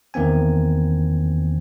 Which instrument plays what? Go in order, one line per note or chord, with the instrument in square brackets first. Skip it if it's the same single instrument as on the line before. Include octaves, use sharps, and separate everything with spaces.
[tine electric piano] E2 D#3 A#3 C4 G#5